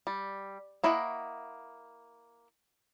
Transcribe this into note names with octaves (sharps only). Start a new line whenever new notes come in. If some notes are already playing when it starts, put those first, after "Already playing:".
G3
A#3 E4 C#5 D#5 F#5